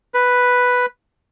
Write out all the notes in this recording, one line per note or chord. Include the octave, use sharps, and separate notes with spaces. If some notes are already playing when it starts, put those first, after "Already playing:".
B4